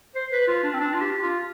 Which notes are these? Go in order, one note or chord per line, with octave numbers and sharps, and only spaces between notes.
C5
B4
F4
D4
C4
D4
F4
G4
F4